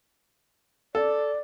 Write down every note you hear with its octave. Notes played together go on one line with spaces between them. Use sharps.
A4 D5